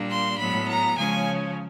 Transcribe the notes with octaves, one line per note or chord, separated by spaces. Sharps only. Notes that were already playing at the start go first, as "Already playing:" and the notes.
Already playing: A#2 G3 A#3 D4
C6
A2 F#3 B3 B5
A#5
C#3 F3 G#3 C#4 G#5